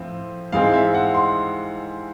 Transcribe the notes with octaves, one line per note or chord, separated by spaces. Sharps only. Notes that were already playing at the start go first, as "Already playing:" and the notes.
Already playing: A2 F3 C4
G#2 E3 G#3 C4 F5
E5
F#5
C6